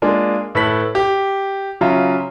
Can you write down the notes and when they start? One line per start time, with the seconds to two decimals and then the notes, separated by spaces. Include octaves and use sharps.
0.02 G#3 A#3 D4 F4
0.55 A2 A4 B4 B6 F#7
0.95 G4
1.81 C#3 F#3 F4 E5 A#5